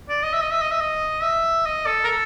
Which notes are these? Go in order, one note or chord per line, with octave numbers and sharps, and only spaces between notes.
D5
D#5
E5
D#5
E5
D#5
E5
D#5
E5
D#5
A4
A#4
A4